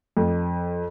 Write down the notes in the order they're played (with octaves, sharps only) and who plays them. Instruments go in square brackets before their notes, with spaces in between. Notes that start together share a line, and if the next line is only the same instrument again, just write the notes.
[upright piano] F2